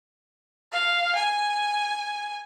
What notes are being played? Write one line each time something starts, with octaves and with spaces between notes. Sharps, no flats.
F5
G#5